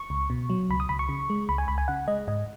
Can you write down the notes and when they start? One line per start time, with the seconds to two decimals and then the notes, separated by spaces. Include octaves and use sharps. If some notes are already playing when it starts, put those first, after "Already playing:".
Already playing: C#6
0.10 C#2
0.30 B2
0.50 F#3
0.70 C#2 B5
0.80 D#6
0.89 C#2 B5
0.99 C#6
1.09 C#3
1.30 G#3
1.49 C#2 B5
1.58 G#5
1.68 C#2 B5
1.78 G#5
1.88 C#3 F#5
2.08 G#3 D#5
2.28 G#2 D#5